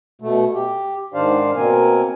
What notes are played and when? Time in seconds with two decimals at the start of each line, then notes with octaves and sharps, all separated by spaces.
0.21 B2 A3
0.54 G4
1.14 G#2 D#3 D4 C5 D5 F5
1.56 B2 A#3 C4 A#4 G#5